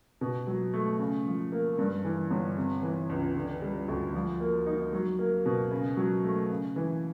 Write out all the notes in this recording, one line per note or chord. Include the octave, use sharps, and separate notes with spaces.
B2
F#3
A3
C#3
F3
A#3
G2
E3
G1
C3
E3
C#2
D3
G3
D2
F3
A#3
D#4
F#3
A#3
B2
C#3
F#3
A3
C#3
E3